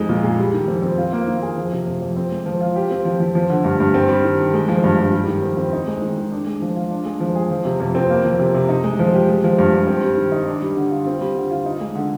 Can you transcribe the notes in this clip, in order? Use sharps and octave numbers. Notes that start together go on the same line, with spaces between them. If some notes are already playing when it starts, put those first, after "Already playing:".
Already playing: F2 G#3 D#4
A#2
G#4
G3
D#3
F2
C4
F4
A#3
D#3
G#4
F3
C3
F2
F2
C4
G#3
F3
F4
G4
C4
F3
F3
F3
D3
G2
G2
C4
G3
D#3
D#3
G#3
F3
G2
G2
G3
D#3
F2
C4
D#4
G#3
D#3
D#3
D4
G#3
F3
F4
D4
G#3
F3
G#4
F3
C3
F2
C4
A#3
F3
C3
C3
D#4
G#3
F3
G4
G#3
F3
G2
G2
C4
G3
D#3
D#4
D4
G3
D3
F4
C4
G3
D3
F4
D#4
G#3
D3